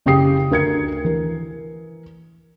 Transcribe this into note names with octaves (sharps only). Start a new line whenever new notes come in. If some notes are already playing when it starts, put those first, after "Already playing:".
F#1 C#3 G4 G5 D#6 C7
D2 A#4 G#6 C#7
E3 A#4